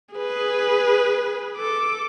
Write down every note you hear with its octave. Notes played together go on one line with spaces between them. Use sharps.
G#4 B4
A4 D6